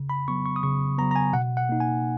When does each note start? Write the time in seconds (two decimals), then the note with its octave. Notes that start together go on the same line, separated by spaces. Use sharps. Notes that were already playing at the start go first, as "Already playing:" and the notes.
Already playing: C#3
0.10 B5
0.28 F#3 B3 C#6
0.46 C#6
0.56 D#6
0.63 C#3 C#6
0.98 B3 A#5
1.02 F#3
1.11 A#5
1.16 G#5
1.33 B2 F#5
1.57 F#5
1.69 A#3 D#4
1.80 G#5